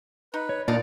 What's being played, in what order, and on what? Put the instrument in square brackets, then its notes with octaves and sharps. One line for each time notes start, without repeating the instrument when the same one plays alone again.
[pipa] D#4 [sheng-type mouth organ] B4
[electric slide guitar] C#5
[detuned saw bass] A#2 [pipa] D4 D#4 F#5 [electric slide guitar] D5 [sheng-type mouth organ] F6